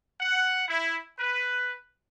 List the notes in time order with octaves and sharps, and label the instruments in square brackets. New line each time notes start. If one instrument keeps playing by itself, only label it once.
[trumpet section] F#5
E4
B4